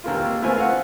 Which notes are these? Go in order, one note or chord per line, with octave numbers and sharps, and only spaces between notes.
D#2 A#3 F4
A3 B3 C4 F4 A#4 G#5
F5 F#5